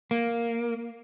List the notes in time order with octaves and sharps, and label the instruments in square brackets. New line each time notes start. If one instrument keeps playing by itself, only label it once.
[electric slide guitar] A#3